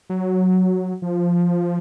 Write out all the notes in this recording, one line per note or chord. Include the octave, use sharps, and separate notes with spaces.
F#3
F3